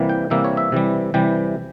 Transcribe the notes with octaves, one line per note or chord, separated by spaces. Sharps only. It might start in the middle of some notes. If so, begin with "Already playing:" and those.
Already playing: C3 E3 G3 A#3
G5
C3 E3 G3 A#3 E5
C#5
E5
C3 E3 G3
C3 E3 G3 G5